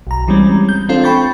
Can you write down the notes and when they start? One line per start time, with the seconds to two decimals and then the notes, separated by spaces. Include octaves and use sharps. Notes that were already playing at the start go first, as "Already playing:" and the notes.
0.07 B1 A#5
0.28 E3 G3 G#3 C4 C#4
0.69 G6
0.89 C4 D4 F4 A4 C5
1.04 G5 B5 C#6 G6 A6